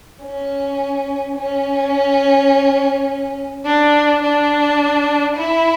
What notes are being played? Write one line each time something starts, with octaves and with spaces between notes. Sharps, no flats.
C#4
C#4
D4
D4
E4